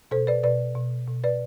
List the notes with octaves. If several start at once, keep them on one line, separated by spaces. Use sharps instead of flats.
B2 A4 C5
B4 D5
B2 B4 D5
B2
B2
B4 D5